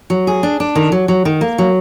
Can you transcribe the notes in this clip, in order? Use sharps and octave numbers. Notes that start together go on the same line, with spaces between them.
F#3
G#4
D4
D4
D#3
F#3
F#3
D#3
A#3
F#3